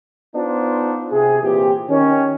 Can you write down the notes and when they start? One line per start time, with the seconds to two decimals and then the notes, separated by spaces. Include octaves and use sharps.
0.35 B3 D4 D#4 F4 C5
1.11 C3 G#4
1.42 A#2 E3 C4 G4
1.89 D#3 C#4